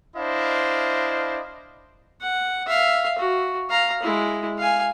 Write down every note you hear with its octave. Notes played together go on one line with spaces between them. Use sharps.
D4 E4 C5 D#5 F5
F#5
E5 F5
F#4
F5 A#5
G#3 E4
F5 G#5